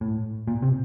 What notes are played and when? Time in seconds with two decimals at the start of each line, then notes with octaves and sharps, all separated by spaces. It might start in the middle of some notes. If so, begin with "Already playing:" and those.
0.01 A2
0.47 A#2
0.62 C3